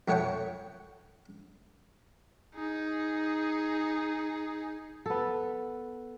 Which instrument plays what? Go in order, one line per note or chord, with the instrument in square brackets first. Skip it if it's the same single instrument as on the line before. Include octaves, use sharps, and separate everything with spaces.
[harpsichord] F2 A3 C#5 F#5 G5 C#6
[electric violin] D#4 G#4
[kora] B3 A4